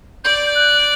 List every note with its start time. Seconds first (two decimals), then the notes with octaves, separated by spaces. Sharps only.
0.24 D5 G6
0.55 F#6